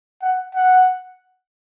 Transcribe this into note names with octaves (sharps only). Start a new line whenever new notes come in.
F#5
F#5